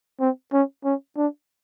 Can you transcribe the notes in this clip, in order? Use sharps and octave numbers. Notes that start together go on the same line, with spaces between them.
C4
C#4
C#4
D4